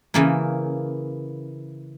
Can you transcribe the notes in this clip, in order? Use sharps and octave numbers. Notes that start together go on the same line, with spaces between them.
C#3 E3 A#3